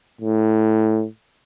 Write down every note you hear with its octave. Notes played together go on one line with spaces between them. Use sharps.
A2